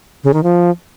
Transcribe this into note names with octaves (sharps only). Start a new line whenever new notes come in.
C#3
D#3
F3